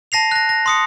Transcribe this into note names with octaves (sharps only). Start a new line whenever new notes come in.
A5 A#6 C7 F7
F#6 A#6
A#6
C6 D#6 C#7